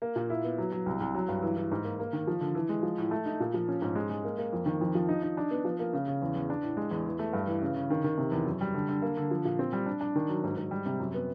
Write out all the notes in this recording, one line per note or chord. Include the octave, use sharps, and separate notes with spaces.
A#3
A#2
E4
B3
F#3
F#3
C2
C2
F#3
G2
E3
E3
G#2
A#3
A#3
D#3
F3
D3
E3
G#3
F3
A2
A3
D#4
A#2
F3
C#4
G#2
G#3
G#3
A#3
A#3
F2
D#3
F2
F3
D#4
D#4
D4
B3
F3
A#3
C#3
C#3
E2
E2
D4
A2
G#3
E2
E3
A3
G2
E3
C#3
C#3
D#3
D#3
C3
E2
F#2
G3
D3
D3
A#3
D3
F3
A#2
C4
G3
D4
D4
D#3
F#3
G#2
G#2
G3
C3
F#2
B3